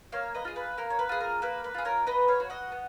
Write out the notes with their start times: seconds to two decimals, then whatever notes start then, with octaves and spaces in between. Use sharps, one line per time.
0.12 A#3 C#5 F5
0.35 B4 D#5
0.45 F4 G#4
0.56 B4
0.78 A#3 A#4
0.90 C#5
0.99 B4
1.09 F4 G#4
1.21 A#4
1.42 A#3 B4
1.64 B4
1.74 F4 G#4
1.85 A#4 C#5
2.07 B3 B4 D#5
2.28 C#5 F5
2.40 F#4
2.50 D#5 F#5
2.72 B3